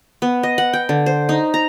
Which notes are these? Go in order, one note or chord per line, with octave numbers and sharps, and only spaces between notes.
B3
D#5
F#5
G5
D3
C5
D#4
A#5